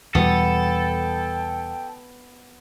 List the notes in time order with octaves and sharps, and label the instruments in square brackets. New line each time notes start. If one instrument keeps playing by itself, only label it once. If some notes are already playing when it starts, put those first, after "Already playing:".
[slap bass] E2 B2 G3 [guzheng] B3 [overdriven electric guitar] A4 [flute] G5